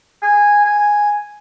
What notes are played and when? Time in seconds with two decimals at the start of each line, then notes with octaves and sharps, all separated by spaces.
0.23 G#5
0.65 G#5